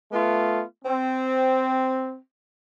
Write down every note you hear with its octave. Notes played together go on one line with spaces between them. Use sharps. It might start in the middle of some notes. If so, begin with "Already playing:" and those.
A3 B3 F4
C4